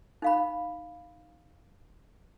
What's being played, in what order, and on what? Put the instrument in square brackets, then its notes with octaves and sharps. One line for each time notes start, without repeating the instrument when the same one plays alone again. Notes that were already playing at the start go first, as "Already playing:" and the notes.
[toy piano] D#4 F5 B5